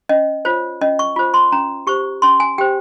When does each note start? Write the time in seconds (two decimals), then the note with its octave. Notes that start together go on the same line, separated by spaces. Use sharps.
0.09 C#4 D#5
0.45 F4 C5 C#5
0.81 C#4 D#5
0.99 C#6
1.16 F4 C5
1.34 C6
1.52 C#4 A#5
1.87 G4 C5 C#6
2.22 C#4 C6
2.40 G#5
2.58 G4 C5 G5